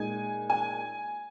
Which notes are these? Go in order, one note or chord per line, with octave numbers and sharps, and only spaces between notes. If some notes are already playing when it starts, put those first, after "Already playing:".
Already playing: A#2 G#3 D#4 G#5
G#5